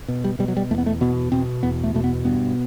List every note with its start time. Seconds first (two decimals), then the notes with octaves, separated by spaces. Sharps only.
0.08 B2
0.24 G3
0.39 B2 G3
0.48 F#3
0.57 G3
0.71 E2 A3
0.78 B3
0.86 A3
1.01 B2 B3
1.32 B2 C4
1.63 E2 B3
1.84 A3
1.94 B2 A3
2.04 B3
2.25 G2 B3